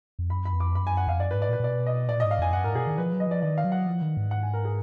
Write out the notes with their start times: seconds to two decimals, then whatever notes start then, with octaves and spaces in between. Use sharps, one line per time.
0.19 F2
0.30 F#2 B5
0.45 B5
0.53 F2
0.60 D6
0.75 F#2 B5
0.87 G#5
0.97 F#5
1.07 F2 F5
1.20 F#2 D5
1.31 G#2 B4
1.42 D5
1.49 A#2
1.53 B4
1.60 A#2
1.64 B2 D5
1.86 D#5
2.08 A#2 D5
2.20 G#2 D#5
2.31 F5
2.39 F2 G#5
2.53 F#2 F#5
2.64 G#2 A#4
2.75 B2 G#4
2.87 D#3
2.98 F3 B4
3.13 F#3
3.20 D#5
3.27 F3 D5
3.42 D#3 D5
3.58 F5
3.64 F#3
3.72 F#5
3.87 F3
4.02 D#3
4.17 G#2
4.31 F#5
4.43 G#5
4.53 A#4
4.65 G#4